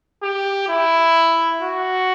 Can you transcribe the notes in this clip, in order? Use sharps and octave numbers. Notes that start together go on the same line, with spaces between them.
G4
E4
F#4